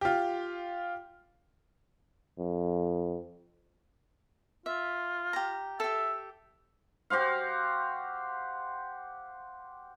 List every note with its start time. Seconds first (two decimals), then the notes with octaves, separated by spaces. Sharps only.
0.01 F4 G4
2.39 F2
4.66 F4 E5
5.33 G4 A#5
5.80 G4 A4 E5
7.10 F#4 G4 C5 F5